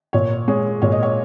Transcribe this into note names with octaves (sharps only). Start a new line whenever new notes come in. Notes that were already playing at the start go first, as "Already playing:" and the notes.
A#2 C#5
G#3 C#5
A#2 C#5
D#5
C#5